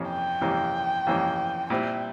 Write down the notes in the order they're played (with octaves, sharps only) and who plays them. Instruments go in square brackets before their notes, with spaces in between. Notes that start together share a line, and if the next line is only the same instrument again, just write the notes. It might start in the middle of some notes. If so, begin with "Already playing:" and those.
Already playing: [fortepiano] F2 C3 E3 A#3 C#4
[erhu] G5
[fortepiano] F2 C3 E3 A#3 C#4
F2 C3 E3 A#3 C#4
[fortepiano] A#2 G3 C4 E4 [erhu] G5